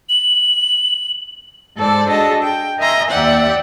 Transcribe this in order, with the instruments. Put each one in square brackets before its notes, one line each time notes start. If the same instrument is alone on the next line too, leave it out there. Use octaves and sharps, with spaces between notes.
[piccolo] F#7
[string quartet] G#2 A4 C5 D5
D4 F#4 G#4 A4 D#5 A5
G5
A#4 D#5 E5 G#5 A#5 C6
D#2 D5 E5 F#5 G5 F#6